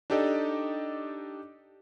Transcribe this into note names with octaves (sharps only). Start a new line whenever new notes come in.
D4 D#4 G4 A4 D5 D#5